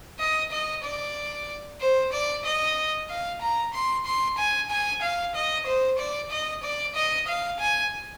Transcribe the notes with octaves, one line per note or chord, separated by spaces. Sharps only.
D#5
D#5
D5
C5
D5
D#5
F5
A#5
C6
C6
G#5
G#5
F5
D#5
C5
D5
D#5
D5
D#5
F5
G#5